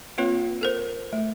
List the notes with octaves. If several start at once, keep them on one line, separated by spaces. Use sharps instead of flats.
A#3 C4 F4 B4 C#5
A4 A#4 C5
A3